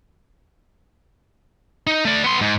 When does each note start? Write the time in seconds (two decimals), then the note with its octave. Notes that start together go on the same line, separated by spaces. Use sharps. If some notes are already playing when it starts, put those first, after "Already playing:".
1.87 D#4
2.05 A3 D5
2.24 B3 C6
2.41 G#2